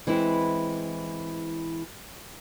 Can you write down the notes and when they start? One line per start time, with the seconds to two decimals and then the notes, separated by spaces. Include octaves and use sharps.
0.07 E3 G#3 C4 E4